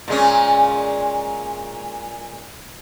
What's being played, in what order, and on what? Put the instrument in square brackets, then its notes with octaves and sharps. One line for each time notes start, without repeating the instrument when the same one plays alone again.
[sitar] A#2 G#3 C#4